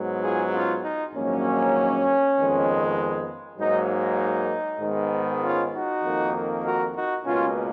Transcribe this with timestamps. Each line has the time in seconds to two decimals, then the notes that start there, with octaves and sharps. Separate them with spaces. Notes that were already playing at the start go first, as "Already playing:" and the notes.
Already playing: G#2 F#3 B3
0.22 F4 G#4
0.52 C#4 F4
0.83 D#4
1.13 A#1 G#2 D#3 F#3 A#3 C#4
2.36 F2 D#3 G#3 B3
3.58 G#2 F#3 A#3 D#4
3.88 D#4
4.80 G#2 D#3 G#3 B3
5.42 C#4 F4
5.72 D#4 F#4
6.03 F2 D#3 A#3
6.63 F#4 A#4
6.95 D#4 F#4
7.25 C#2 B2 A#3 C#4 F4